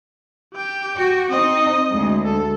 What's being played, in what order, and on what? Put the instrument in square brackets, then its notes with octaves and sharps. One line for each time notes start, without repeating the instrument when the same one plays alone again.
[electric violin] G4 G5
[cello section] F#4
[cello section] C4 D#4 [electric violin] D#5
[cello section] D2 G#3
[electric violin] A4